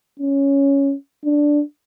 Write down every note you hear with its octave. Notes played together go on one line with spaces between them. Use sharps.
C#4
D4